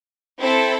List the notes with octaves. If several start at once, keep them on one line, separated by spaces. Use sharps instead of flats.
C4 E4 A4